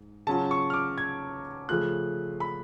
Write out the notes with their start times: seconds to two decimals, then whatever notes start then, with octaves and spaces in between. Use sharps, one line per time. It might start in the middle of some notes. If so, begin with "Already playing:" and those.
Already playing: G#2
0.27 C#3 F#3 C#4 F4 A5
0.51 C#6
0.70 F6
0.74 D6
0.98 G#6
1.69 C#3 F3 A3 F4 F#6
2.40 B5